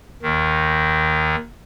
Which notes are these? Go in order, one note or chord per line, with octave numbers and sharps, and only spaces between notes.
D#2 D#3